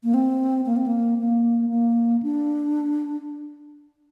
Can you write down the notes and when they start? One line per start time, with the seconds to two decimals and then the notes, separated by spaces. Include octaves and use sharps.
0.04 A#3
0.14 C4
0.66 A#3
0.76 C4
0.86 A#3
1.19 A#3
1.70 A#3
2.23 D4